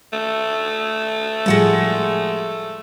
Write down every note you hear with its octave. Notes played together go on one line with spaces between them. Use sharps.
A3
A2 F3 G3 G#3 F#5 A5